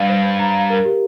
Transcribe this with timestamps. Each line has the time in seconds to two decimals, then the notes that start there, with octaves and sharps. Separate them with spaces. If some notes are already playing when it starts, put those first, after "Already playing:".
Already playing: G2 F5
0.09 C5
0.24 C5
0.39 A#5
0.55 F5
0.70 A#4
0.85 G4